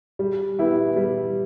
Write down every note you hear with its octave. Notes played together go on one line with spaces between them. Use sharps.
G3
B3 E4 G4
G3